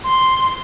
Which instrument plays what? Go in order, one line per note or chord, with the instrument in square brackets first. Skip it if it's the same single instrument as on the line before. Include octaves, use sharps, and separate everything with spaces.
[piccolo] C6